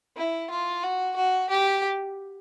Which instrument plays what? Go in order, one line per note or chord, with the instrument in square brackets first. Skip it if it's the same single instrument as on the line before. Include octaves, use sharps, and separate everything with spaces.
[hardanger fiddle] E4
F4
F#4
F#4
G4